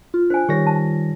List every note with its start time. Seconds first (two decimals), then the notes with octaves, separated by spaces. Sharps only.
0.14 F4
0.30 D4 C5 G#5
0.49 D#3 G3 G4 C#5 A#6
0.67 A5